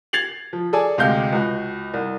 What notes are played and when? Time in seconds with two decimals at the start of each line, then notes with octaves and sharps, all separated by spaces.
0.13 G#6 A6 C7 F7 F#7
0.53 F3
0.73 G#4 A4 D5 G#5
0.98 D2 C3 G#3 G4 F5 G6
1.33 C#2 F#4
1.94 C2